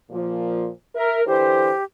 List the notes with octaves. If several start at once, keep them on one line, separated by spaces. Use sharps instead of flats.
A#2 F3
A#4 E5
D3 E3 G4 C5